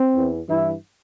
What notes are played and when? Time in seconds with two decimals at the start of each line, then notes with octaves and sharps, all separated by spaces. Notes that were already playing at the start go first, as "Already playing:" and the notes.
Already playing: C4
0.15 E2 E3
0.48 G2 E3 E4